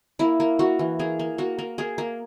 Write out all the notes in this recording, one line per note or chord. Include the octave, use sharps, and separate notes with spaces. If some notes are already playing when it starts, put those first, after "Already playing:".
A#3 E4
A#3
A#3 F#4
E3
A#3 G#4
A#3
A#3 F#4
A#3
A#3 G#4
A#3